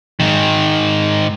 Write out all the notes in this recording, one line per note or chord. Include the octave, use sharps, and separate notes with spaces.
G#2 D#3